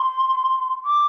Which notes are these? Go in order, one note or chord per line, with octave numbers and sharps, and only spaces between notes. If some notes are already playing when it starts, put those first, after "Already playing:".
Already playing: C6
D6